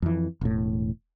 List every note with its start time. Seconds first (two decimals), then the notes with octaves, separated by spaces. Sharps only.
0.02 F2 E3
0.41 E1 A2